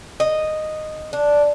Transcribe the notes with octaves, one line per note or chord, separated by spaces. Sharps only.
D#5
D4